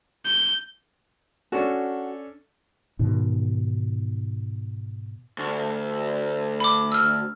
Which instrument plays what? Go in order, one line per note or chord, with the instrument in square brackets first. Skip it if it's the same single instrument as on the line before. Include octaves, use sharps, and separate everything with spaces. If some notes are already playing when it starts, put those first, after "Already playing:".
[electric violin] G6
[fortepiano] C#4 D4 A4 [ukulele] F#4
[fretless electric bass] G#2 B2 D#3
[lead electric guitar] D2
[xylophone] B5 D6
E6 F6